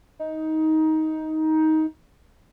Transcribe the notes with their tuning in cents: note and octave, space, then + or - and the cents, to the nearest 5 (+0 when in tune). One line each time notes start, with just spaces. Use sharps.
D#4 +15